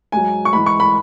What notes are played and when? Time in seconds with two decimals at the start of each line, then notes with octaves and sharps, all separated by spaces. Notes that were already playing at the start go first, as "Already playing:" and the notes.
0.12 G#2 F#3 G#5
0.45 C#6
0.53 G#2 E3 B5
0.66 C#6
0.80 B5